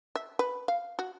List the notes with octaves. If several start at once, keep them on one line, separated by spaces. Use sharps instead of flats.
E5
B4
F5
F#4